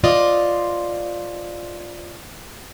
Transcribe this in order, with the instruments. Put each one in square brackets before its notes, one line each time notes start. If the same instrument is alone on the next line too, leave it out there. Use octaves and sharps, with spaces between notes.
[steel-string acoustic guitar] F4 C5 D5 D#5